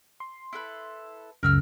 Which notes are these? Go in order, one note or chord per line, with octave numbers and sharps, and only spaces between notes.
C6
E4 A4 B4
C#2 F#2 C#3 A#4 E6 F6